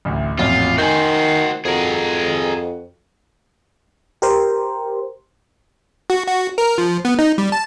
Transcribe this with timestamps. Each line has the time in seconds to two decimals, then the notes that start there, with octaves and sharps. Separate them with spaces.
0.05 A1 D2
0.39 A1 F2 A#2 F#3 F4
0.78 D#3 F#4 C5 G#5 G6
1.65 F2 F#4 G#4 A#4
4.22 G4 A#4 C5
6.10 F#4
6.27 F#4
6.58 A#4
6.78 F3
7.05 B3
7.19 D#4
7.38 G3
7.52 A5